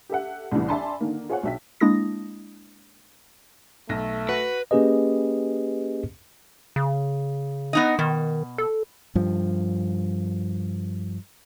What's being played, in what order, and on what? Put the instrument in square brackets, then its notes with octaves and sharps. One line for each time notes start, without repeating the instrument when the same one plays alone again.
[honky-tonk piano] G4 A4 E5 F#5
C2 A2 C#3 E3
D5 E5 G#5 A5 B5 C6
D3 D#3 A#3
F4 G#4 C5 C#5 F#5
B1 F#4 E5 G5 B6
[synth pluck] G#3 A#3 D4 E4 D#6 A#6
[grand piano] B1 A#6 [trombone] A3
[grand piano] F#4 F#5 [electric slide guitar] B4
[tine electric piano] A#3 C#4 G4 G#4 B4 D#5
[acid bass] C#3
[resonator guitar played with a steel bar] B3 D#4 D#5
[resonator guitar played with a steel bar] B2 [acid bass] D#3
[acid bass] A4
[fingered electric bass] G2 F3